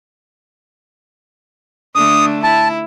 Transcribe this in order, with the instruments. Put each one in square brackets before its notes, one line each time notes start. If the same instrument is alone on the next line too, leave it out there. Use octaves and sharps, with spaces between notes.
[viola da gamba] D3 A3 D4 [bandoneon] D#6
[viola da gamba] E4 [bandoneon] A5